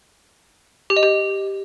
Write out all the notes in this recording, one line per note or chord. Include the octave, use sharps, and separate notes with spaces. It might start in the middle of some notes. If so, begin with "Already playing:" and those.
G4
D#5
G4